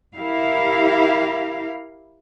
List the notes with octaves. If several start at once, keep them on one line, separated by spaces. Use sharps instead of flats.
E4 G4 A#4 F5